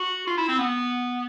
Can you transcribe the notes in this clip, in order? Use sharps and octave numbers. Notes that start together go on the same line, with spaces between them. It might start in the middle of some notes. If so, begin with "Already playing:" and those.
Already playing: F#4
F4
E4
C4
B3